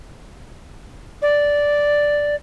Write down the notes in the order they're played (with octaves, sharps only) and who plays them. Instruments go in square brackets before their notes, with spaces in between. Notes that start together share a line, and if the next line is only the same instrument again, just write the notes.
[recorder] D5